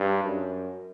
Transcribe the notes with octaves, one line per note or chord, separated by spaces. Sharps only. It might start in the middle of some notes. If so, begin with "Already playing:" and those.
Already playing: G2
F#2